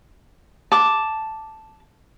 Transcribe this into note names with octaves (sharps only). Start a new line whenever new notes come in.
A5 D6